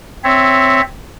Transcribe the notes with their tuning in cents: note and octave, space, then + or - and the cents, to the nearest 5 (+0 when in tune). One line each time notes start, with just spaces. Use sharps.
C4 +0 C#5 +0 E5 +0